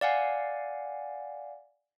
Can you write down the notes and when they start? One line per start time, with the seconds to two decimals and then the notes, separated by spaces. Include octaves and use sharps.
0.01 D5 F5 F#5 G#5